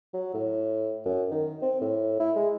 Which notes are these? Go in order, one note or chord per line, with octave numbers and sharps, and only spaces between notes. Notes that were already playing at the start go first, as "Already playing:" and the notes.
F#3
A2
F#2
D#3
C4
A2
E4
G#3